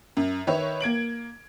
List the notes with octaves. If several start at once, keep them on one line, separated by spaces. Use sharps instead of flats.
F#2
D#3 B4 C#5 E5
A#3 G#6 D7 F#7